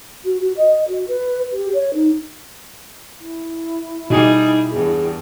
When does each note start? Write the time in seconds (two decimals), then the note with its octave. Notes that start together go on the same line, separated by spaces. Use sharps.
0.25 F#4
0.40 F#4
0.57 D#5
0.88 F#4
1.08 B4
1.53 G4
1.73 C#5
1.94 D#4
3.20 E4
4.10 B2 G3 D#4 G#4
4.71 E2 G2 G#4